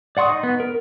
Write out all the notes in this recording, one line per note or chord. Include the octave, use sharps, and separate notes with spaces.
D5 F#5 C6 C#6 D#6
D#4
B3
A#4